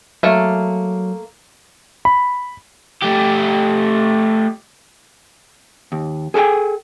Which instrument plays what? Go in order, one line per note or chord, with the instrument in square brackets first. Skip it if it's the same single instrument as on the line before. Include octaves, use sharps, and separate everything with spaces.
[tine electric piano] F#3 [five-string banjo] A3 A#3
[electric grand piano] B5
[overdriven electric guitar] A3 G4
[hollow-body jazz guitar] D#2
G#4 A4 B4 G5 G#5